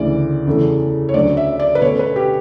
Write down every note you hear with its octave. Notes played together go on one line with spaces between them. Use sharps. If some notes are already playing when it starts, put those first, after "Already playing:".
Already playing: D2 C#3 E3 D5
E2 C#3 E3 A3
C#5
D2 D3 F#3 C#4 D5
E5
D5
B4
B2 A3 C#4 C#5
B4
G4